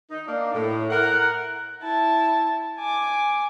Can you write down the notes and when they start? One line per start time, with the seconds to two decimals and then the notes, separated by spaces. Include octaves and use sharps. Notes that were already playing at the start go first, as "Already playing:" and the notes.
0.11 D#4
0.27 A#3 D4
0.53 A2
0.90 A#4 F#5
1.82 E4 A5
2.78 G#5 D6